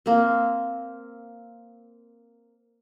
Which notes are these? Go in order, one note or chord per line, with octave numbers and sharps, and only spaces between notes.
A#3 C4